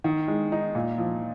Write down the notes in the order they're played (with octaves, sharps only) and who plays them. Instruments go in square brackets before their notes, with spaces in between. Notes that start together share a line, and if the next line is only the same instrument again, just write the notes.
[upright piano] D#3
G#3
D#4
A#2
F3